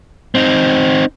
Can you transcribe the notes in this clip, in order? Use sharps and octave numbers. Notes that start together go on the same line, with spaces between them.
C4 D#4